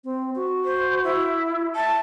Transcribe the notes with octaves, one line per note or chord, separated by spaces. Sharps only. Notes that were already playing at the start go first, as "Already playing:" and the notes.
C4
F#4
C5
E4
E5 A5